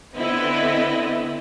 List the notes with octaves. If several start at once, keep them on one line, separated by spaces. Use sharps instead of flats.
D3 B3 C4 E4 B4 D#5